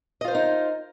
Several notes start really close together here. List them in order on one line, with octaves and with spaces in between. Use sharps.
D#5 F4 C5 A#4 D#4